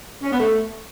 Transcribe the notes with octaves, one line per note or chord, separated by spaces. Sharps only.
C#4
B3
A3